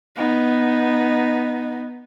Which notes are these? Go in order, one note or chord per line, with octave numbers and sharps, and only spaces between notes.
B3 D#4